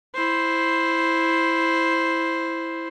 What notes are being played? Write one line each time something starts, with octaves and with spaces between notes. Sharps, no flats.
E4 C5